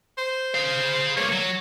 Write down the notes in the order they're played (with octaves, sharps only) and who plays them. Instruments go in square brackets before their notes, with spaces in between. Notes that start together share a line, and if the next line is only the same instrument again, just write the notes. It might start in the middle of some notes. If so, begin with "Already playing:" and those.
[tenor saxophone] C5
[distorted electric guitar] G#4 F5
[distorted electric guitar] G2 A#3 [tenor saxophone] C#5
[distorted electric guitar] F#3